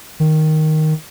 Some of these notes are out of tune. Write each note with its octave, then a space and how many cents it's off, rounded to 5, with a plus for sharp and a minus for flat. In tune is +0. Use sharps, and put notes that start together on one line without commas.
D#3 +0